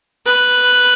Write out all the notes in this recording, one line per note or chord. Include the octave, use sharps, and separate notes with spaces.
B4